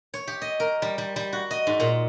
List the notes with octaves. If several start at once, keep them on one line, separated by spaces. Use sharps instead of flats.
C#5
G4
D#5
A#4
G3
G3
G3
F#4
D#5
G#2
A#2